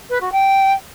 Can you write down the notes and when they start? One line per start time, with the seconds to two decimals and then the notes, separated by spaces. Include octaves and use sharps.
0.09 B4
0.20 F#4
0.32 G5